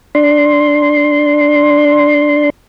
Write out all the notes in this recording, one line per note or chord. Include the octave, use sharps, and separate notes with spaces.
D4 C6